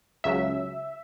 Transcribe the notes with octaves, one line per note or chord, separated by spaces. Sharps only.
C#2 C#3 F#3 E5